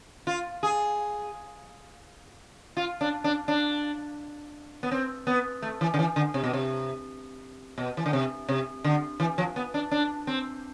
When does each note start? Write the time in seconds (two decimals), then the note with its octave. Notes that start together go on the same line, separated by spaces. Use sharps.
0.27 F4
0.63 G#4
2.77 F4
3.01 D4
3.24 D4
3.48 D4
4.83 B3
4.91 C4
5.27 B3
5.62 A3
5.81 E3
5.94 D3
5.99 E3
6.16 D3
6.34 C3
6.44 B2
6.53 C3
7.78 B2
7.97 E3
8.06 D3
8.13 C3
8.49 C3
8.84 D3
9.20 E3
9.38 F3
9.56 B3
9.74 D4
9.91 D4
10.27 C4